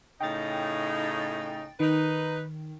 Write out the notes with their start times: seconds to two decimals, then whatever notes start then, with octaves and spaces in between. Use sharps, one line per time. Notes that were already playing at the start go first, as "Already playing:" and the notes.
0.21 A2 C#3 D#4 G5 A6
1.80 D#3 D#4 B4